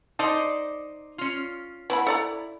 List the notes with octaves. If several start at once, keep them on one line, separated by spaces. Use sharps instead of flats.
D#4 A4 C5 D5
C#4 F4
B3 E4 C5 B5
A4 D5 A#5